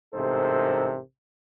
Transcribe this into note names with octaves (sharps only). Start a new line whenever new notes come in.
A1 G#2 C3 A4 A#4 C5